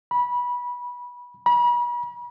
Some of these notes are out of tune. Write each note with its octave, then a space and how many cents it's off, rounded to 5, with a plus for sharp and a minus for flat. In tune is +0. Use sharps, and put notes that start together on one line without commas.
B5 -20
B5 -40